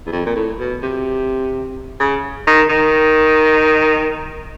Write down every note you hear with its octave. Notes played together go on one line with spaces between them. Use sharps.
E2
F2
A#2
A2
B2
C3
C#3
D#3
D#3